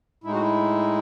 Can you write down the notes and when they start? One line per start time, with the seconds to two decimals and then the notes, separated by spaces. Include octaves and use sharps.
0.24 A2 G#3 D#4 E4
0.33 F#4
0.41 E4